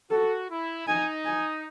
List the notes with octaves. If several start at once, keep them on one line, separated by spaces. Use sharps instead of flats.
F#4 A4
E4
D#4 G#5
G#5